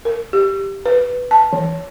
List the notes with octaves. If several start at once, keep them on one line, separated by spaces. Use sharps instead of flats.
A#4
G4
B4
A5
E3